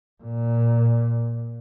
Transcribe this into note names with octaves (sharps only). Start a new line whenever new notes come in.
A#2